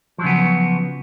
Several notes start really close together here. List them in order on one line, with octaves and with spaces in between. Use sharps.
F3 F#3 C#3 B3